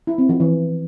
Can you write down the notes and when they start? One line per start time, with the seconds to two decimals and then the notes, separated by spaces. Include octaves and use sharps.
0.07 E4
0.18 C4
0.29 F3
0.40 E3